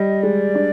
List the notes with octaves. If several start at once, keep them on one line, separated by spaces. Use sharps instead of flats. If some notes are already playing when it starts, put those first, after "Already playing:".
Already playing: G3 D#5
G#3 D5
D4